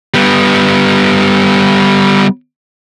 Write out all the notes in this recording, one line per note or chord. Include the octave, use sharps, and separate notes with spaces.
G3 B3